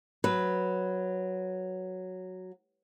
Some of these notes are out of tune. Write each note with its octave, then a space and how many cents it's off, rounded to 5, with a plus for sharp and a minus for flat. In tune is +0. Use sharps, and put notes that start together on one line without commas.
F#3 +0 B4 +0